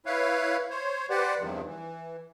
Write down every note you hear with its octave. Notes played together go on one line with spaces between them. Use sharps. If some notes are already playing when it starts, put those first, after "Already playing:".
E4 B4 C#5 F5
C5 C#5
G4 B4 C5 D5 F#5
E2 G2 C3 D#3 F3
E3